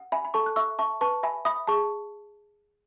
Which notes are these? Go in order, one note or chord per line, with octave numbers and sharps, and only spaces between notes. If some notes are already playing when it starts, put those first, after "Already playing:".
Already playing: F#5
E5 G#5 B5
B5
A4 A5 C#6
F#6
E5 C#6 E6
E5 A5 C#6
B4 A5 C#6
E5 G#5 B5
E5 B5 D#6
G#4 A5 C#6